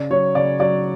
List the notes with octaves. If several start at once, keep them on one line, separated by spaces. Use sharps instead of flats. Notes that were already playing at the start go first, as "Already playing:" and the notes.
Already playing: C#3 D5
F#3 C#5
C#3 D5
F#3 D5